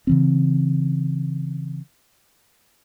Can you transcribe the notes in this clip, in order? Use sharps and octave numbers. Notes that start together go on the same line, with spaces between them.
C#3 E3 C4